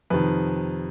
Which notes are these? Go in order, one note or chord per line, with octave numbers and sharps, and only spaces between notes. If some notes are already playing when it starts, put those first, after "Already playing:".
F2 C3 D#3 B4